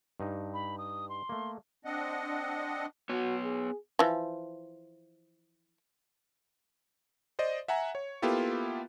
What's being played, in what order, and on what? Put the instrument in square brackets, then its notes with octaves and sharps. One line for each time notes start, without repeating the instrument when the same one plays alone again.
[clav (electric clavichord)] G2 D#4
[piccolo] B5
D#6
C6
[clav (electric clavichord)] A3 A#3
[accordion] C4 D4 D#5 F#5
[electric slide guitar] B3 C#5 [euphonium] F#4
[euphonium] G#4
[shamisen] E3 F3
[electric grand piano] C5 D5 D#5
E5 F#5 G#5 A#5
C#5
A#3 B3 E4 F4 G4 A4